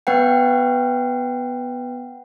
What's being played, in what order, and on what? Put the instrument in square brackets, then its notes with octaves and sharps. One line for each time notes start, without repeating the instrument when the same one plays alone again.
[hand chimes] B3 B4 F#5 G5